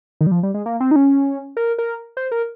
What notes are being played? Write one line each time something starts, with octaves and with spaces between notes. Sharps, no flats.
D#3
G3
F3
G3
G#3
A#3
C4
D#4
C#4
A#4
A#4
C5
A#4